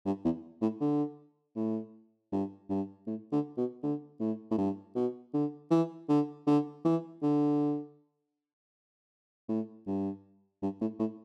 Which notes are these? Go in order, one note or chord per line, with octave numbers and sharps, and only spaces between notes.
G2
E2
A2
D3
A2
G2
G2
A2
D3
B2
D3
A2
A2
G2
B2
D3
E3
D3
D3
E3
D3
A2
G2
G2
A2
A2